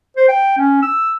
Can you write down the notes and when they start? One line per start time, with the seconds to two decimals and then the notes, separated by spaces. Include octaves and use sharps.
0.17 C5
0.29 G5
0.58 C#4
0.83 E6